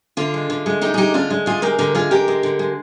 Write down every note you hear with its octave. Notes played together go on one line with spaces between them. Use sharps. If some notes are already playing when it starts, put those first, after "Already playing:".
D3 D4 F4
G#3
D3
G#3
D3 D#4 G4
G#4
G#3 D#4 G4
D3 D4 F4
G#3
D3 F4 G#4
G#3 G4 A#4
D3 G4 A#4
G#3 F4 G#4
D3 G4 A#4
G#3
D3
G#3